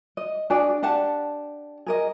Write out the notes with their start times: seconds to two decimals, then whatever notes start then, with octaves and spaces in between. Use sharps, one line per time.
0.17 D#5
0.50 D4 F#4 G#4 D5
0.83 D4 G4 F#5 A5
1.86 G#4 A#4 D#5